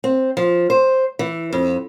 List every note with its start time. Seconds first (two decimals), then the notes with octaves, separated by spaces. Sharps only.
0.04 C4
0.37 F3
0.70 C5
1.19 E3
1.53 F2